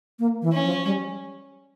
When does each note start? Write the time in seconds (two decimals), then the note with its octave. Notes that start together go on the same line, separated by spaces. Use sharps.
0.19 A#3
0.42 E3
0.53 C#4
0.64 F3
0.85 G3